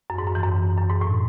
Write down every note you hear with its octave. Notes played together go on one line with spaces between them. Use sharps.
F#2
G#2
F#2
E3
F#2
F#2
G#2
A2